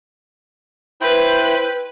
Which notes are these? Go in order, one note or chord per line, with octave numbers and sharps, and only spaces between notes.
E4 B4 C5 G5